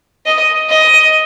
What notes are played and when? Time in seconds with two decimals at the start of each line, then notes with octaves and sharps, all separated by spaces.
0.26 D#5
0.70 D#5